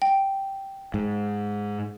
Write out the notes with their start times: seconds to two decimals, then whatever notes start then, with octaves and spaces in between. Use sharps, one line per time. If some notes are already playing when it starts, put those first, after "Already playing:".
0.02 G5
0.94 G#2